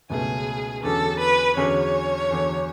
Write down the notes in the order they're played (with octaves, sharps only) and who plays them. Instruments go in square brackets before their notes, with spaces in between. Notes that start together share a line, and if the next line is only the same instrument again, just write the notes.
[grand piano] C#2 B2 F#3 A3 C#4 [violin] G#4
[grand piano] E2 D3 F#3 C#4 G#4 [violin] A4
[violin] B4
[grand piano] E2 D3 F#3 C#4 G#4 [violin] C#5
[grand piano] E2 D3 F#3